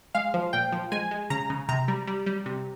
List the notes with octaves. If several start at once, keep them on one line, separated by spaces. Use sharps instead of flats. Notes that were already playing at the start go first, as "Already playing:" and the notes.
G#3 F5
F3
A#2 G5
F3
G#3 G#5
G#3
C#3 A#5
C#3
C3 A#5
G3
G3
G3
C3